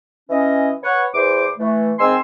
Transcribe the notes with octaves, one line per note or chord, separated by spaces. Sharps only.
E3 C#4 D#5
B4 C#5 F#5
E2 E3 C5 D6
E3 A3
G#2 D#3 C4 G#5 C6 E6